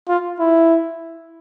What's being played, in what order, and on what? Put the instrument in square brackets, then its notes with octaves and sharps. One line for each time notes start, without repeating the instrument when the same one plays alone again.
[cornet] F4
E4